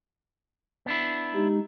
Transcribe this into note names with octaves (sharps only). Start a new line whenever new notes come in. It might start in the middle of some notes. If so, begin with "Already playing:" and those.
B3 D4 E4
G#3 D#4 G4